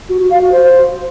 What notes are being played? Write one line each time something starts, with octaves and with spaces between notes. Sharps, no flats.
F#4
F#4
F5
F#4
C5